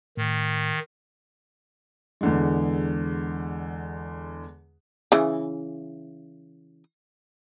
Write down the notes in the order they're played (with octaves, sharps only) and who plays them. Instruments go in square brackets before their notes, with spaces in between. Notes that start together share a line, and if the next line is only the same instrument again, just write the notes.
[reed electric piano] A2 [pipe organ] D#3
[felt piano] E2 D3 G#3
[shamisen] C#3 E3